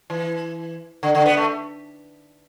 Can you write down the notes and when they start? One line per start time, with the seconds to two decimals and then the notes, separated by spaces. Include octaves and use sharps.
0.10 E3
1.03 D3
1.15 D3
1.26 B3
1.37 A3